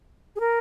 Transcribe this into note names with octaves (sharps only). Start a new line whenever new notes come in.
G#4
A#4